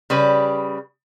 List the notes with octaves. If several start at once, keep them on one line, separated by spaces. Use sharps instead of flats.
C#3 G3 B4